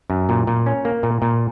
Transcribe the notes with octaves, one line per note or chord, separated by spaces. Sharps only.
F#2
A#2
A#2
C#4
A#3
A#2
A#2